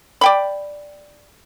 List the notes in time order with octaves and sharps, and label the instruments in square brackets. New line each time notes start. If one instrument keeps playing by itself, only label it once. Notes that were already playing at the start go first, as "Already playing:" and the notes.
[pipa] D5 G5 B5